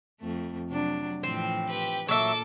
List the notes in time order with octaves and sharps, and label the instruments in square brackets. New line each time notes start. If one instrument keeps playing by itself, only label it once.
[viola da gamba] F2 A3
C3 F#3 D4
[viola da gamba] A2 E3 F3 [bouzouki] C4
[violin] G4 B4
[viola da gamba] A#2 A#3 [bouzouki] F#3 E5 [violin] A4 D6